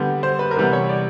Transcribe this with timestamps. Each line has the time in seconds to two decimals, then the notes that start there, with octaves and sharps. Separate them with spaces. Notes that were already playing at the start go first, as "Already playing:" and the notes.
Already playing: D3 G3 B3
0.23 C5
0.39 B4
0.51 A#4
0.56 C3 E3 G3 B3 B4
0.73 C#5
0.89 D5